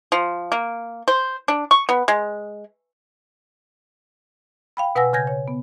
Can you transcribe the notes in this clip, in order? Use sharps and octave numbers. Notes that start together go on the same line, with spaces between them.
F3
A#3
C5
D4
C#6
B3
G#3
F5 G5 B5
B2 B4 F#5 G#5 E6 A#6
C#3 G#5 G6 G#6 A#6
C#5
B3